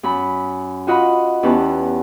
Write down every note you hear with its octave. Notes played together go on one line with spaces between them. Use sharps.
F#2 B5
F4 F#4 D#5 F#5 B5
E2 C#4 G4 B4 A5